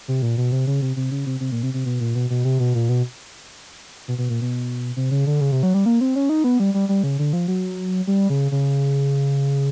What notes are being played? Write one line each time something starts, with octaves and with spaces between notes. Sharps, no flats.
C3
A#2
B2
C3
C#3
C3
C3
C#3
C3
C3
A#2
C3
C3
B2
A#2
B2
B2
C3
B2
A#2
B2
B2
B2
A#2
B2
C3
C#3
D3
C#3
C3
F#3
G3
A#3
C4
C#4
D#4
B3
G3
G3
G3
C#3
D3
F3
F#3
G3
C#3
C#3